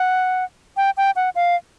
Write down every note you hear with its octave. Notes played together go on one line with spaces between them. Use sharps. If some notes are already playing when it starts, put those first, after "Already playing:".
Already playing: F#5
G5
G5
F#5
F5